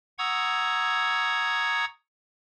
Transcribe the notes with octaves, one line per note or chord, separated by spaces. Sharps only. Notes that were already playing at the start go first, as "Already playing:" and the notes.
F#5 A#5 C#6 D#6 E6 G#6